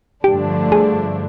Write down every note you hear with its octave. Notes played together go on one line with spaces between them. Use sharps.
G2 D3 F3 A3 D4 G4
G#4